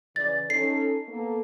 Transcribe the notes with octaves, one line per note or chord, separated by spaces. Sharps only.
C#3 E3 D5 A6
C#4 D#4 A4 C7
A#3 B3 A4